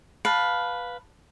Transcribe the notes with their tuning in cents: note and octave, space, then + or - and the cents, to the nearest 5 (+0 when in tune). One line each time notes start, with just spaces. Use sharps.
B4 +0 F5 +15 A5 +0